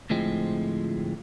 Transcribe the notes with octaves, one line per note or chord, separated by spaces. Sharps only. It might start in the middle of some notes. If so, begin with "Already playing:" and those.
D2 A2 F3 G#3 C4